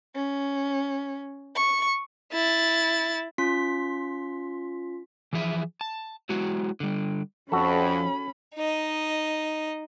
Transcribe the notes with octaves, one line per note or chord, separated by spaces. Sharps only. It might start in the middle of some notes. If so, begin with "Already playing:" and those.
C#4
C#6
E4 A6
C#4 F4 C6 B6
E3 F3 G#4 E5
A5
F#3 G#3 E4 F#4
D3 G3
F2 F3 C#4 F#4 A4 B5
D#4 D#5